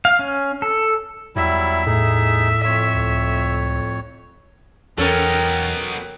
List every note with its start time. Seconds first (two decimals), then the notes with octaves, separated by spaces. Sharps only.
0.05 F5
0.19 C#4
0.62 A4
1.36 E2 F#3 G3 E4 E5
1.86 A2 D#4 G#4
2.65 F2 C#5 C6
2.95 C#2
4.98 E2 F#3 B3 C#4 A4 A#4 G5